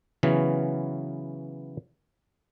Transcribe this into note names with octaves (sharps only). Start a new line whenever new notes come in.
C#3 E3 F#3 B3 C#4